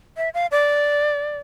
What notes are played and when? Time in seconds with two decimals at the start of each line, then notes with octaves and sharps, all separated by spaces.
0.17 E5
0.34 F5
0.51 D5